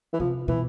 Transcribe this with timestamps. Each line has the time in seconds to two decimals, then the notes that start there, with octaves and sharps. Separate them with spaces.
0.13 E3
0.20 C3 F3
0.48 B2 E3